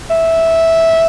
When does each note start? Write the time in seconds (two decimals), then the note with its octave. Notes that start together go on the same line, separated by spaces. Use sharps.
0.10 E5